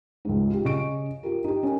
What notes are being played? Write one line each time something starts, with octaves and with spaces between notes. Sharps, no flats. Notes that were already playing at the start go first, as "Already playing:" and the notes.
C#2 G#2
F4 G4
C#3 D#5 C#6 D7
F4 G4 A#4
D#4 G4
C#4 A#4